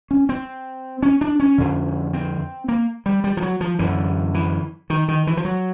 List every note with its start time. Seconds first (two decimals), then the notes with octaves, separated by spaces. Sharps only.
0.11 C#4
0.29 C4
1.03 C#4
1.21 D4
1.40 C#4
1.58 F2 D3
2.13 C4
2.68 A#3
3.06 G3
3.24 G3
3.37 F3
3.42 F#3
3.61 F3
3.79 F#2 D3 E3
4.34 E3
4.90 D#3
5.08 D#3
5.27 E3
5.37 F3
5.45 F#3